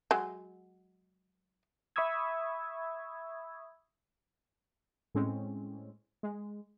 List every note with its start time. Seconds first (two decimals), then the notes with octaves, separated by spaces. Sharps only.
0.11 F#3 G#3
1.96 E5 B5 C#6 D#6 E6 G#6
5.15 A2 G#3 C4 C#4
6.23 G#3